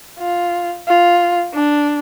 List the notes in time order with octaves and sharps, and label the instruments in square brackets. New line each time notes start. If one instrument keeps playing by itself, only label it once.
[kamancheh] F4
F4
D4